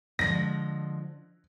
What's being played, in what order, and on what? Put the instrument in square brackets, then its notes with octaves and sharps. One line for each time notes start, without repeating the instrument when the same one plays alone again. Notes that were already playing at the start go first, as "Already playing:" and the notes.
[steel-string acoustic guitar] D3 F3 G#3 [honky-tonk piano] A#6